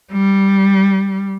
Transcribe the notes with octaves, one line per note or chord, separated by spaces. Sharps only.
G3